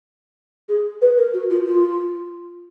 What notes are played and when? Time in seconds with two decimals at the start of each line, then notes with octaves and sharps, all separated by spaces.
0.68 G#4
1.01 B4
1.17 A#4
1.33 F#4
1.50 F4
1.66 F4